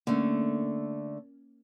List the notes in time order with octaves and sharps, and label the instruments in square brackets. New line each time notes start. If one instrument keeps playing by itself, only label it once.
[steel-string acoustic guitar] D3 A3 [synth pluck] A#3 C#4